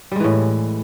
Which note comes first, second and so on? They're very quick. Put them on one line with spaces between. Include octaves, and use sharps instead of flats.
G3 G#3 E3 A2